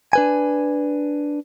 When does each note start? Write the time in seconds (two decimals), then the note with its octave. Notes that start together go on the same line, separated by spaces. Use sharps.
0.13 D4 B4 G#5